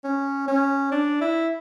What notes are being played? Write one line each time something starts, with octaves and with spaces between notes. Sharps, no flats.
C#4
C#4
D4
E4